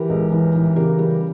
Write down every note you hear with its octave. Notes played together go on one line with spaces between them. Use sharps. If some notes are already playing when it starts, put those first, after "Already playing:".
Already playing: E3 G4 A#4
C#2
E3
E3
C#3 G4 A#4
G3